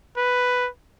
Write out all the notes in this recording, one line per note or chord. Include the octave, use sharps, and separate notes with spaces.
B4